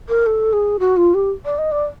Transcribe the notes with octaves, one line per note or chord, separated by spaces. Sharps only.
A#4
A4
G#4
F#4
F4
G4
D5
D#5
D5